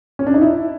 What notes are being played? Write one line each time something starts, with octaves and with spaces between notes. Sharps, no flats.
C#4
D4
D#4
E4